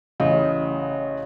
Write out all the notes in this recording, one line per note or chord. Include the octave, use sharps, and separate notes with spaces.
A1 C#3 D#5